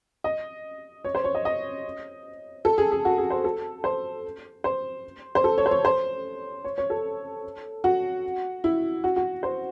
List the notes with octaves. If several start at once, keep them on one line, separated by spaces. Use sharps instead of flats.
D#5
C#5
C5
C#5
D#5
D#5
A4
G#4
G#4
F#4
G#4
C5
A4
C5
C5
C5
A4
C#5
C5
C#5
C5
C#5
C#5
A4
F#4
E4
F#4
F#4
C5